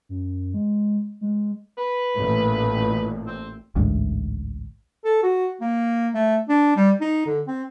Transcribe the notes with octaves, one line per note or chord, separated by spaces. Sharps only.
F#2
G#3
G#3
B4
A1 A#2
C4
A1 D2 G#2
A4
F#4
A#3
A3
D4
G3
D#4
D3
C4